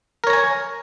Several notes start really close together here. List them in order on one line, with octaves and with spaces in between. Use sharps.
A#4 C#5 A#5 G#5